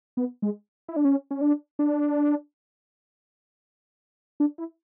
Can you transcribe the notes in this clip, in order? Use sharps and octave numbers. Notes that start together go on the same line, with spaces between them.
B3
G#3
E4
D4
C#4
C#4
D4
D4
D4
E4